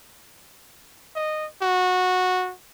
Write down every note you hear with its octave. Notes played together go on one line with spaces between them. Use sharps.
D#5
F#4